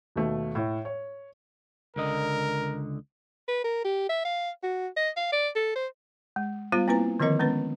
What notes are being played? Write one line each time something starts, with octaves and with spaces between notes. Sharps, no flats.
D#2 B2 A3
A2
C#5
C#2 D3 A#4 D#5
B4
A#4
G4
E5
F5
F#4
D#5
F5
D5
A4
C5
G#3
G3 B3 F4 C5 F5
A#3 C4 E4 B4 A#5
D3 D#3 F3 C4 A#4 D#5
G#3 B3 C#4 B4